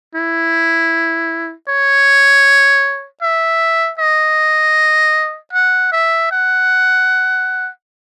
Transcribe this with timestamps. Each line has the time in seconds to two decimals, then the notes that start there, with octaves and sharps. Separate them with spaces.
0.15 E4
1.69 C#5
3.22 E5
3.99 D#5
5.53 F#5
5.92 E5
6.31 F#5